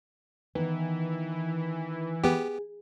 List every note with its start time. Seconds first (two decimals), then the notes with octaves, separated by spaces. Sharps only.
0.55 D#3 E3 B3
2.24 B3 G4 G#4